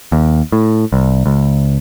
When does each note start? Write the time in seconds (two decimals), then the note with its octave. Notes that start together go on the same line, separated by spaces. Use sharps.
0.12 D#2
0.52 A2
0.93 C2
1.26 C#2